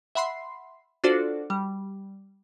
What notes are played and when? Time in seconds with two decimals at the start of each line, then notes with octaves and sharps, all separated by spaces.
0.15 E5 F#5 B5 C6 C7
1.04 D4 F4 F#4 A4 C5 D5
1.50 G3